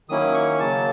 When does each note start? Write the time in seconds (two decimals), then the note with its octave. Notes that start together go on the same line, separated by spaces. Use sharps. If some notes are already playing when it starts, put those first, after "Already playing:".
0.09 D#3 F#3 A#3 C#4 E4 D#6
0.34 C#6
0.59 C#3 F#3 A#3 A5